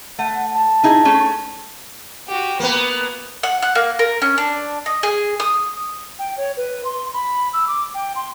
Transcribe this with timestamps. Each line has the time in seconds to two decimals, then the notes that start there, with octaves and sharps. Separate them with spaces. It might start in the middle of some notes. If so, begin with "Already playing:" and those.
0.19 A3 F#5
0.55 A5
0.83 D#4 E4 G#4
1.05 A3 C#4 G#4
2.28 F#4 G4
2.60 A#3 B3 B4
3.43 F#5
3.62 F#5
3.75 A#3
3.99 A#4
4.22 C#4
4.38 D4
4.86 D#5
5.03 G#4
5.40 D#6
6.19 G5
6.37 C#5
6.57 B4
6.85 C6
7.13 B5
7.53 E6
7.67 D6
7.94 G5
8.16 C6